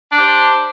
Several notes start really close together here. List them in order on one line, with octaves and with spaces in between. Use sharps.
D4 G4 C5